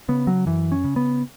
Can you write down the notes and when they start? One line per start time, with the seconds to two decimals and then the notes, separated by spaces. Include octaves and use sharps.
0.09 C#3 B3
0.27 F#3
0.46 F#2 E3
0.72 C#4
0.84 C#3
0.96 B3